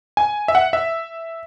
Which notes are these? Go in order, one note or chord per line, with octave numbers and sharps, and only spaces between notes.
G#5
E5
F#5
E5